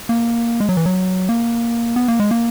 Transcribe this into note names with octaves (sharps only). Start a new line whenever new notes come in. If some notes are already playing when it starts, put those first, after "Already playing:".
A#3
G#3
F#3
E3
F#3
A#3
B3
A#3
G#3
A#3